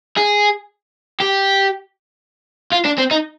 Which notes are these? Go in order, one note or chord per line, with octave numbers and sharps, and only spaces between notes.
G#4
G4
F4
D4
C4
D#4